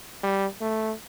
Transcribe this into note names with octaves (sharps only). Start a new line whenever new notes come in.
G3
A3